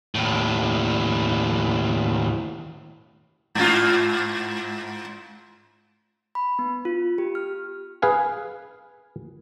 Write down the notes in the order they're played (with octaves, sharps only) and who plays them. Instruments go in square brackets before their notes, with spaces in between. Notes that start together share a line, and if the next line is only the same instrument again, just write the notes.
[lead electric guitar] D#2 A2
[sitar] G#2 F4
[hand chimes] B5
B3
F4
G4
F6
[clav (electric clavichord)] G#4 B4 F5 G#5